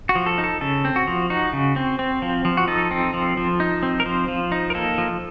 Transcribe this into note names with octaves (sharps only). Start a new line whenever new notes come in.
F#4
F3
A4
D#4
A4
C#3 A4
C4
F#4
F3
D#4 F#4
C#3
C4
C4
F3
F3
F#4
D#4 A4
C4
F3
F3
D#4
C4
A#4
F3 C5
F3
D#4
A#4
A#3 A4
F3